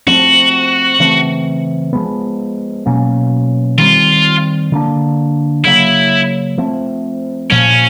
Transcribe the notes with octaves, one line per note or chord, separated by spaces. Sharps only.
F3 A3 C4 F#4
C#3 E3 A3 C4
F3 G#3 B3
B2 F#3 A#3 C#4
D#3 G3 C4 F4
D3 F#3 A#3 D4
C#3 F#3 A#3 E4
F3 A3 C4
A#2 F3 A#3 C#4